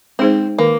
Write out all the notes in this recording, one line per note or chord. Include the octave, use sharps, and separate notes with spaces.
G#3 C4 D#4 G#4 C5
D#3 A#3